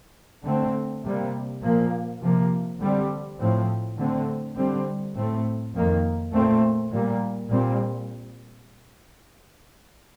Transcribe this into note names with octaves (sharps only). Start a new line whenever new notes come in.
D3 A3 C4
C3 G3 A#3
A#2 F3 A#3
C3 F3 A#3
D3 G3 C4
A2 F3 C4
D3 A3 C4
D3 G3 C4
A2 A3 C4
F2 D#3 A#3
A#2 A3 C4
A#2 G3 A#3
A#2 G3 C4